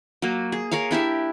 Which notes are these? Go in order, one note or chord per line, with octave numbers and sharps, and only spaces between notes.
F#3 A#3
G#4
G#4 A#4 C#5 F5
D4 E4 G4 E5